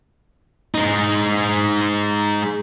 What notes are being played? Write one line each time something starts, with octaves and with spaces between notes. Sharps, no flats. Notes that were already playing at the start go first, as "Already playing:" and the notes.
G#3 D#4